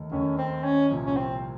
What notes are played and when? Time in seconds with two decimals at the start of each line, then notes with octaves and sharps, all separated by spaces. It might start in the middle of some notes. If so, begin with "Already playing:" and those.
Already playing: D#2 D#3 A3
0.12 D#2 D#3 A3 C#4
0.38 C4
0.64 C#4
0.90 C2 A#2 F3
1.05 C#4
1.16 C4